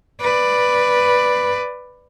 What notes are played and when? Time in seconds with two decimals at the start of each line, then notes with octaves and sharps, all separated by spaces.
0.21 B4 D5